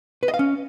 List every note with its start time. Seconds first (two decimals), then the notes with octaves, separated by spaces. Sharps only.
0.23 B4
0.28 D#5
0.34 F5
0.39 C#4